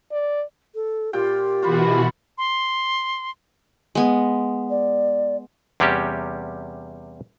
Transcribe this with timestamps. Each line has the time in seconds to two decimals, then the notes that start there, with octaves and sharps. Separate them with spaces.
0.12 D5
0.75 A4
1.13 A#2 F4 G4 G5
1.62 B2 E3 F4 F#4 C5 B5
2.38 C6
3.95 G#3 B3
4.70 D5
5.80 E2 C3 G3 C#4 G4